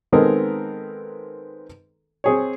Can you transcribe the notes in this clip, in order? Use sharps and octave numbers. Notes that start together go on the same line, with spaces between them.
D#3 G#3 B3 C4 A4 A#4
C4 G#4 C#5